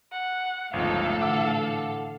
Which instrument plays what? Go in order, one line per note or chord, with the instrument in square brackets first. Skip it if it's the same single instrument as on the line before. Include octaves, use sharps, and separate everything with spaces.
[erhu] F#5
[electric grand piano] G1 C#2 [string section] A2 A4 [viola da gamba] F3 D#4 [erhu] F5
[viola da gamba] D3 E3 [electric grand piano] F#5 D6 E6